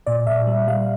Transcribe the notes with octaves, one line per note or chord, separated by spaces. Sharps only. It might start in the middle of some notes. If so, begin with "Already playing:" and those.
A#2 D5
A#2 E5
G3
G3 F5